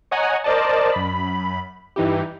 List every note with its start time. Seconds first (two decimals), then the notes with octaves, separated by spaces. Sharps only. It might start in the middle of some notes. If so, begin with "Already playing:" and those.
0.11 C#5 D#5 F#5 G#5 A#5
0.44 A#4 C5 D5 D#5 A5
0.92 F#2 B5
1.96 G2 E3 D#4 E4 G4